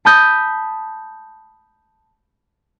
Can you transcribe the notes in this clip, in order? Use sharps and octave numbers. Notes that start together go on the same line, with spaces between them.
A5 B5 D#6 G6